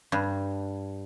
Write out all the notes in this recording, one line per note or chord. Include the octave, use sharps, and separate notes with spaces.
G2